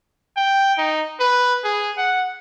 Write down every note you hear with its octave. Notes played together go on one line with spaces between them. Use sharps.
G5
D#4
B4
G#4
F#5